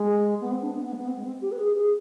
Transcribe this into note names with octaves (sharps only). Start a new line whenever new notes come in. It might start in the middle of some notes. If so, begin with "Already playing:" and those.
Already playing: G#3
B3
C4
D4
B3
B3
G#3
B3
C4
G#3
C4
G4
B4
G#4
G#4